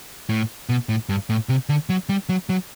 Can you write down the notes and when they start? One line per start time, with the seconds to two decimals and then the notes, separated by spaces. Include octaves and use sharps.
0.29 A2
0.69 B2
0.89 A2
1.09 G2
1.30 A2
1.49 C3
1.69 D3
1.89 F#3
2.09 G3
2.29 F#3
2.49 F#3